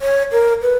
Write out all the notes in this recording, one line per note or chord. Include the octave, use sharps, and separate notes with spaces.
C#5
A#4
B4